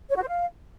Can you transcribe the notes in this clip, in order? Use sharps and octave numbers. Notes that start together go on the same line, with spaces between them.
C#5
F#4
C5
F5